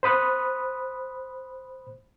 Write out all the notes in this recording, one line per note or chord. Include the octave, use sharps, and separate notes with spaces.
C5 B5 D#6 F#6